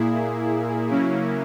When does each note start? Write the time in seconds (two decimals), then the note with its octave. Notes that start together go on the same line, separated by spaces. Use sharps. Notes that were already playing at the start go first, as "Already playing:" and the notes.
Already playing: A#2 A#3 E4 G#4
0.89 C#3 F#3 A#3 C#4 E4